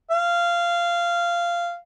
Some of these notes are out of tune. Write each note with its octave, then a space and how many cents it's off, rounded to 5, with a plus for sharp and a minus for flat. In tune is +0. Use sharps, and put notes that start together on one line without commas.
F5 -15